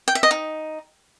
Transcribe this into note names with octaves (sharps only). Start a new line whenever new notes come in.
G5
E5
D#5
D#4